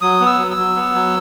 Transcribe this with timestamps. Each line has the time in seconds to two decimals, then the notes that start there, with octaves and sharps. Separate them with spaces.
0.01 F#3 D#6
0.20 B3
0.26 E6
0.38 F#3
0.51 E6
0.57 F#3
0.76 B3
0.94 F#3